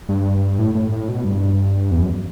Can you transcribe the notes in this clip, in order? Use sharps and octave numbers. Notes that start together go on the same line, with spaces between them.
G2
A2
A2
A2
B2
G2
E2
F#2